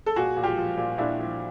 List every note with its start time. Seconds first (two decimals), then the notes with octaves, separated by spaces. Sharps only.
0.06 A4
0.16 A#2 F#4 G#4
0.36 A#2
0.44 F4 G4
0.57 F3
0.77 A#2
0.98 A#2 D4 E4
1.19 F3